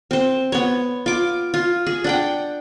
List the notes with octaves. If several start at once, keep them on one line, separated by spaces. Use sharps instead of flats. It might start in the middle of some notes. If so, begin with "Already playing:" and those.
C4 C5
B3 C#5
F4 D6
F4
G#4
D4 F#5 G5